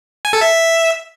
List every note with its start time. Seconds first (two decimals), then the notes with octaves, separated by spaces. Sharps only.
0.25 G#5
0.33 A4
0.41 E5